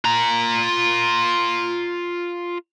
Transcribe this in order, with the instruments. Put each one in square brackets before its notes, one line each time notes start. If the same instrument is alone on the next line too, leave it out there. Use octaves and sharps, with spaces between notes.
[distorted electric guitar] F4 A#5